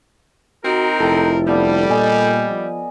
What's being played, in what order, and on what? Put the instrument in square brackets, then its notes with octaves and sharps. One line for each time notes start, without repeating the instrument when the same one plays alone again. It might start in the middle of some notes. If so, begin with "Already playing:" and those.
[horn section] C4 D#4 A#4 [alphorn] F#4
[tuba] F1 [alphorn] E4 [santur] A4 G5
[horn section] G3 [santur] B3 D4 F5
[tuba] A#2 [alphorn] A4 [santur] D#5 G#5
[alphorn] F3